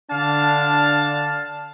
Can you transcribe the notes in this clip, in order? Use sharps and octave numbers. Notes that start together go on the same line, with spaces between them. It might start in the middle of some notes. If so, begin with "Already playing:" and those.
D3 D4 F5 A5